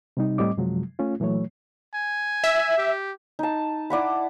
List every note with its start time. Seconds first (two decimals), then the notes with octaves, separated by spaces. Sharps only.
0.17 C3 G3 D#4
0.38 A2 G3 C4 D#5 D6
0.57 F#2 C3 F3 F#3 G#3
0.99 A3 C#4 F4
1.20 A#2 E3 F#3 A3 C#5
1.94 G#5
2.44 E5
2.78 G4
3.39 D#4 A5
3.90 E4 D5 F#5 B5